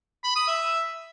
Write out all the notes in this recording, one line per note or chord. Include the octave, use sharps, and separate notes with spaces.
B5
D#6
E5